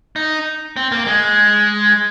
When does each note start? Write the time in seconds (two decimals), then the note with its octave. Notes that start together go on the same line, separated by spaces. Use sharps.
0.16 D#4
0.76 C4
0.92 A#3
1.07 G#3